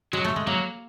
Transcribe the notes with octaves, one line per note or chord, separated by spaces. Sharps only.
F#3 G#3
A3
G#3
F#3 A#3